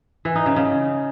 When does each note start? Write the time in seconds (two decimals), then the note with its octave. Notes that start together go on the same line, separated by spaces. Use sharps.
0.25 E3
0.35 D#4
0.46 C#3
0.56 C#3